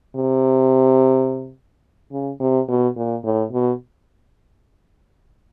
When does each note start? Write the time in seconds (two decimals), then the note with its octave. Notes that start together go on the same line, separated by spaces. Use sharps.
0.15 C3
2.11 C#3
2.40 C3
2.68 B2
2.96 A#2
3.24 A2
3.52 B2